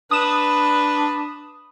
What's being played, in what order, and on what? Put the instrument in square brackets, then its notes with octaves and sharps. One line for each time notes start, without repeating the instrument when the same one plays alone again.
[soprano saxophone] D4 [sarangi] B4 [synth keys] D#6 E7